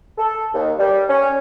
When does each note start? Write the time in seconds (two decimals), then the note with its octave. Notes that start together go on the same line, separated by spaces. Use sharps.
0.18 A4
0.54 D#2
0.79 G3
1.09 C#4